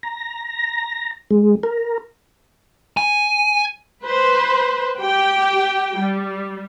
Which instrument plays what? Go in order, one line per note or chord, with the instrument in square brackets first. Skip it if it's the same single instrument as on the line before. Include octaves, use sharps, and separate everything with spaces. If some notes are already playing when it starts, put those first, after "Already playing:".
[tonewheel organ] A#5
G#3
A#4
[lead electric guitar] G#5
[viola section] B4 C5
G4 G5
G3